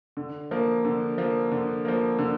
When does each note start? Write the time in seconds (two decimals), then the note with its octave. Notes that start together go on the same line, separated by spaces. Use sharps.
0.17 D3
0.51 F3 A#3
0.85 D3
1.18 F3 A#3
1.52 D3
1.85 F3 A#3
2.19 D3